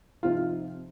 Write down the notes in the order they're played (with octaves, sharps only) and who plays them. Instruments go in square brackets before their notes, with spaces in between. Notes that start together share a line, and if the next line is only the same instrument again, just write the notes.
[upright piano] C3 F3 C4 D#4 F4